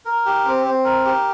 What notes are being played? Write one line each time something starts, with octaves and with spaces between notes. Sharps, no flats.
A#4
G4
C4
C4
A#4
G4